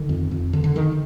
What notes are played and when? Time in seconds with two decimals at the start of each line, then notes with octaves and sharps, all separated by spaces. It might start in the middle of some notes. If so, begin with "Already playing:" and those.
Already playing: D3 D#3
0.09 F2
0.31 F2
0.53 D3
0.64 D3
0.75 D3 D#3